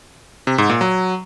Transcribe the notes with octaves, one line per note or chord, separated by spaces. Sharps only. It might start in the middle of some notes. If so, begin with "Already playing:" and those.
C3
G#2
A#2
F#3